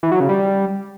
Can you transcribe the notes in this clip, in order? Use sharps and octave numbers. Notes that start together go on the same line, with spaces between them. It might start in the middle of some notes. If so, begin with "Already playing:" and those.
E3
F#3
C#3
G3